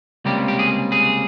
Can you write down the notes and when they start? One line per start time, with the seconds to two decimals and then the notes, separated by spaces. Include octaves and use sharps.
0.25 C#2 C3 G3 A#3 G4
0.48 G4
0.59 G#4
0.92 G#4